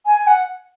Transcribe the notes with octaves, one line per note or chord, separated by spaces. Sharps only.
G#5
F#5